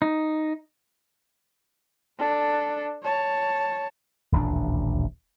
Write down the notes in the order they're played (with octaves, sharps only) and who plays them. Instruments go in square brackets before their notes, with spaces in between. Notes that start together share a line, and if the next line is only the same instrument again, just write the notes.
[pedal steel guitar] D#4
[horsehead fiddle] D4 A4
C#5 A5
[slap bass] D#1 A1 D2 D4